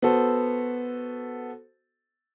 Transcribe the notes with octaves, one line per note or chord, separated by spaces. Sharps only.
B3 F#4 A4 C5